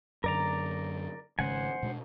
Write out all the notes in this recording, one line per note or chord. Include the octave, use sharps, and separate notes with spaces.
F#2 D3 A#4 D5 A#5
G#1 C#3 G#3 C5 F#5 G#5
B2 G#3 D4